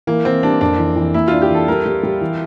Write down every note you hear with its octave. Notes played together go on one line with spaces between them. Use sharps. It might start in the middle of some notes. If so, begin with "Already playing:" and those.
E3 A#3
E3 C4
G3 D4
F2 D4
E3
E3
A#3 E4
D4 F4
G4
E3 A4
G3 A#4
G3
G3
E3